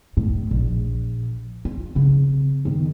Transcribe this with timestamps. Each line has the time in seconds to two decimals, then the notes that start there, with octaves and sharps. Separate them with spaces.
0.17 A2
0.51 A#1
1.65 F4
1.95 C#3 C4
2.65 D#3 B3